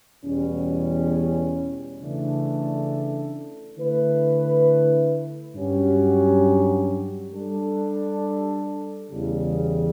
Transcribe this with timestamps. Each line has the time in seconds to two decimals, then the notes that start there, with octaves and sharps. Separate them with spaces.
0.24 E2 B2 G3 C#4
2.00 C#3 E3 A3 D4 A4
3.77 D3 A3 E4 B4
5.55 G2 F#3 C#4 G4
7.31 G3 D4 A4
9.08 E2 C#3 G3